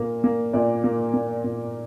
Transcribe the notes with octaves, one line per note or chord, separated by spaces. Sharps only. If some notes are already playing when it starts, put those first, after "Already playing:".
Already playing: A#2 A#3
A#3
A#2 D5
A#3
A#3
A#2